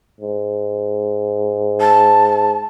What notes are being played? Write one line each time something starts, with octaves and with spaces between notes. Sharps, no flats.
G#2
A5